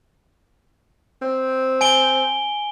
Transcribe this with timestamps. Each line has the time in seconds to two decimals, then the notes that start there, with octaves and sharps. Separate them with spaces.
1.22 C4
1.81 G#5 D7 G7